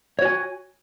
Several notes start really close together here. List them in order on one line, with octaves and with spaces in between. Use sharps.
C#5 F#4 G#5